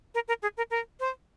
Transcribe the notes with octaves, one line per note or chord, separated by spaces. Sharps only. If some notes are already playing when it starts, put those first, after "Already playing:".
A#4
A#4
G#4
A#4
A#4
C5